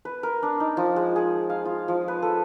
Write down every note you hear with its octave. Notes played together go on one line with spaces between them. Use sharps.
B4
A#4
D4
D#4
F3
G#3
G#4
F5
F4
F3
B4
A4